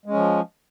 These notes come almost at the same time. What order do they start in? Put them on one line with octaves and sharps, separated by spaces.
G#3 C#4 F3